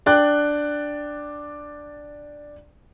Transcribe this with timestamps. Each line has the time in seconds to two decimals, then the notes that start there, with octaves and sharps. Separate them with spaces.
0.06 D4 D5 G5 F#6